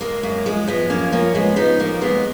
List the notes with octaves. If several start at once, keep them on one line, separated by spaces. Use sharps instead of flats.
G#3 A#3
F#2 A#3
F3 G#3
F3 G#3 B3
F#2 A#3 C#4
F3 A#3 C#4
F3 G#3 B3
F3 B3 D#4
D#3 A#3
D#2 G#3 B3